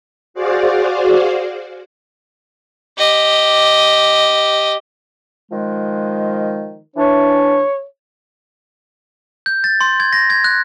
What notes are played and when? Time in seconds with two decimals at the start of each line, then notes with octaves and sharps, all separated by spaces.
0.34 F#4 G#4 C5 D5 F5
2.98 G4 D#5
5.52 D#3 F3 G#3
6.96 E3 D4 C#5
9.46 G6
9.64 A6
9.81 C6
10.00 G#6
10.13 A#6
10.30 G#6
10.44 F#6